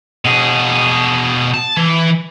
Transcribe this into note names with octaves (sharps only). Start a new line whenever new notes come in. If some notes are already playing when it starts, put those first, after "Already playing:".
B2 G#4
A5
E3